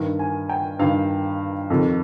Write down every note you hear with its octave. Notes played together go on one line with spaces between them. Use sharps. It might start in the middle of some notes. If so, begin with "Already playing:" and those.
Already playing: G2 D#3
G#5
G5
G2 D#3 F5
F2 C3 D#3